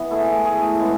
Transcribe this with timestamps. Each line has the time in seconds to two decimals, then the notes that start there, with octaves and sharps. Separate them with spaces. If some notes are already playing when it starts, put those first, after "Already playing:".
Already playing: E3 B3
0.10 A3 E4 G#4
0.45 A3 E4 G#4
0.79 C#3 G#3 B3